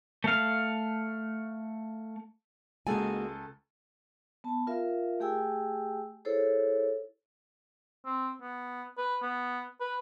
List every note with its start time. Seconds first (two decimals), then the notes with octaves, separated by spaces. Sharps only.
0.24 A3 F5
2.87 C#2 G#3 A#3 F#4 A4 G#5 A5
4.44 B3 A5
4.67 F4 A#4 E5 F5
5.20 A3 G4 G#4 G5 G#5 E6
6.25 E4 G#4 A4 C5 C#5
8.06 C4
8.41 B3
8.98 B4
9.22 B3
9.80 B4